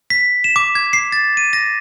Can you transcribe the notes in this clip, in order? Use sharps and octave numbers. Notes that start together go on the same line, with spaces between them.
B6
E7
D6
G#6
C7
A6
D#7
A#6